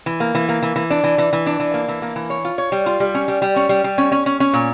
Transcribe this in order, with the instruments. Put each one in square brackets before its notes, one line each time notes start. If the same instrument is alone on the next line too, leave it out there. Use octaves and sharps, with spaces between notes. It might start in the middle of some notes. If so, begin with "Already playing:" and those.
[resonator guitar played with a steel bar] E3
A#3
E3
A#3
E3
E3
D4
E3
E3
E3
D4
E3
A#3
E3
A#3
E3
C#5
F4
C#5
G3
F4
G3
C#4
G3
G3
C#4
G3
G3
C#4
C#4
C#4
C#4
A#2